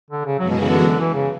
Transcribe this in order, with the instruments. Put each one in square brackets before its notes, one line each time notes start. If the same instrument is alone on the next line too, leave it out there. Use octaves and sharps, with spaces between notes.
[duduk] D3
C#3
[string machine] F#2 E3 G#3 B3 F#4 [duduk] F#3
[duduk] B2
C#3
D3
E3
C#3